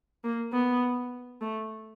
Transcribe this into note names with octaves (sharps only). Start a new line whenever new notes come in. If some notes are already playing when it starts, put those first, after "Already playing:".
A#3
B3
A3